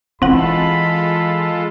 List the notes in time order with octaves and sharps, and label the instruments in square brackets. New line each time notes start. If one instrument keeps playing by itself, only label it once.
[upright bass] E3 [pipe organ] G#3 F4 A4 [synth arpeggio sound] C4 F#5 [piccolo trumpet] B5